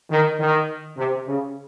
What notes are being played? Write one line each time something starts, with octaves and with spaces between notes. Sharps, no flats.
D#3
D#3
C3
C#3